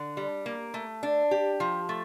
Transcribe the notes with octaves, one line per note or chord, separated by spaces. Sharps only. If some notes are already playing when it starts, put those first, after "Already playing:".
Already playing: D3
G3
A#3
A3
D4
G4
F3
A3